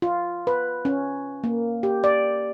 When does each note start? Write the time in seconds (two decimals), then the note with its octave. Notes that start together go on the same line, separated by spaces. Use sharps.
0.02 F4
0.47 B4
0.85 C#4
1.44 A#3
1.83 G4
2.04 D5